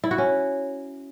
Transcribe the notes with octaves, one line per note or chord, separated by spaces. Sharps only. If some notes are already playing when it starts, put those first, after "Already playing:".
E4
F#4
C#4